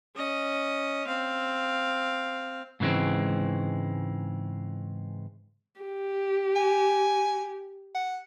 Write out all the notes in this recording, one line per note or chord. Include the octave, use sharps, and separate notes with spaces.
C#4 D#5
C4 F5
G#2 C#3 E3 G#3 C4
G4
G#5
F#5